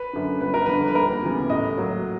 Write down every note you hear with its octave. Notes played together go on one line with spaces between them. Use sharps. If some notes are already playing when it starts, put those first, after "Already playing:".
Already playing: B4
F#2 D3
G1 B4
A#4
F2 D3 B4
B4
D#2 A#4
C#3 E3 G3 B3
A2 D#5
F#3 A#3